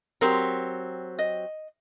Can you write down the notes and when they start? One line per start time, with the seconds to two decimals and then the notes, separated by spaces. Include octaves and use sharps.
0.21 F#3 C4 G4 A#4
1.19 D#5